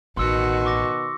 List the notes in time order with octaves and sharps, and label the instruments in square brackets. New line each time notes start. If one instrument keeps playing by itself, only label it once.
[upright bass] A1 [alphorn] B2 [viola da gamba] D#3 F#4 [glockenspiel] C6 E6 C#7
[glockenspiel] C#6 D6 A#6